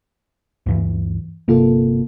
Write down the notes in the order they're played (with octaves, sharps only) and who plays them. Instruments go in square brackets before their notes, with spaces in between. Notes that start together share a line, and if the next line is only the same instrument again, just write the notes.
[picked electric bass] D2 G2 E3
[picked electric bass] G1 C3 [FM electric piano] A#3 F4 A4